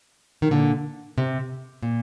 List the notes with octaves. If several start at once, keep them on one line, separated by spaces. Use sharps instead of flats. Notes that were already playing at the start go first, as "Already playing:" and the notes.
D#3
A#2 D3
C3
A#2